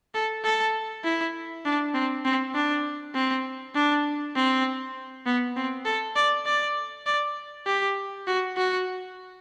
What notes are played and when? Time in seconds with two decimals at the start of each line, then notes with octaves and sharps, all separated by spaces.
0.15 A4
0.44 A4
1.05 E4
1.65 D4
1.94 C4
2.25 C4
2.54 D4
3.15 C4
3.75 D4
4.35 C4
5.26 B3
5.56 C4
5.85 A4
6.16 D5
6.46 D5
7.06 D5
7.66 G4
8.27 F#4
8.57 F#4